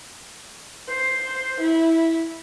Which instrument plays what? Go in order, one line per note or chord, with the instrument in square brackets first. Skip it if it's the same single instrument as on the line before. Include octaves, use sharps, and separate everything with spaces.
[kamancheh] C5
E4